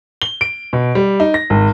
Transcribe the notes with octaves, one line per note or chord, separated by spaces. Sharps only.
G7
D7
B2
G3
D#4
A#6
G#1